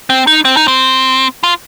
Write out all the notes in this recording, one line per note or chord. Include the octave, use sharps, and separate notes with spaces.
C4
D#4
C4
D#4
C4
F4